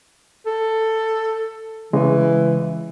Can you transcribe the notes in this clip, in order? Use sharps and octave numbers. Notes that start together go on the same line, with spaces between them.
A4
C#3 E3 G#3